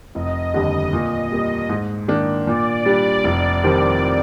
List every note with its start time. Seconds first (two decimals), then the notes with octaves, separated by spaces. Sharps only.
0.15 F1 D#5
0.54 D#2 D3 G3
0.93 A#2 D#5
1.31 G3 A#3 D#5
1.69 G#2
2.08 D#3 A#3 D4
2.47 A#2 D5
2.86 G3 D4
3.24 F1
3.63 F2 D#3 G3 C4